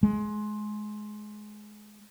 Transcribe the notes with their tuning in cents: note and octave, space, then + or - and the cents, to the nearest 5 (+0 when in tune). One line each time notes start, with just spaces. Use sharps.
G#3 +20